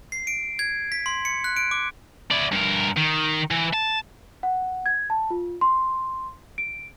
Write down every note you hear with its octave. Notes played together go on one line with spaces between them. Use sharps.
C7
D7
G#6
B6
C6
C#7
F#6
D7
D6
E4 D5
G2 A#4
D#3
E3
A5
F#5
G#6
A5
F4
C6
D7